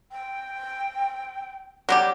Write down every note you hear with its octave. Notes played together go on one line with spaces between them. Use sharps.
G5
F#3 G3 G4